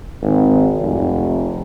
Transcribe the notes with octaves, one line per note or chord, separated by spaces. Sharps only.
G#1
F1